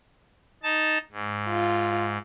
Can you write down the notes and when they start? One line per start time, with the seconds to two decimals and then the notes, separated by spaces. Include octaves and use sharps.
0.63 D#4 A5
1.12 G#2
1.49 F4